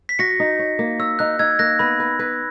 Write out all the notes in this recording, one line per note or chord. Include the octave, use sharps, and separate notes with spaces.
B6
F#4 A#6 C#7
D#4
C#5
A#3
C#5 E6
D#4 F#6
D#4 E6 G#6
A#3 F#6 A#6
B3 B5
B4
B4